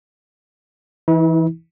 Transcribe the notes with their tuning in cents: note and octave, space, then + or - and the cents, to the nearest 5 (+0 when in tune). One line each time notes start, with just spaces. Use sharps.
E3 +0 E4 -40